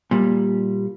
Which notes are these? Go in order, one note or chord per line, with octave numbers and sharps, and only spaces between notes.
A#2 G3